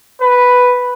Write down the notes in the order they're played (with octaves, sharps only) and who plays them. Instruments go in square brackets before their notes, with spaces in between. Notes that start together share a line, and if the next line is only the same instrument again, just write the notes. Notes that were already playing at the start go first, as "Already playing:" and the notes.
[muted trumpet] B4